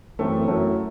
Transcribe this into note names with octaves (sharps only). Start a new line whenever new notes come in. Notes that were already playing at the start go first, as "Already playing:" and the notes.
F#2 E3 A3 C4
F#2 F#3 A3 E4